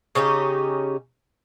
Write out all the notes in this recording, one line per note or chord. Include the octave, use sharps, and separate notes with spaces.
C#3 C#4 D#4 G4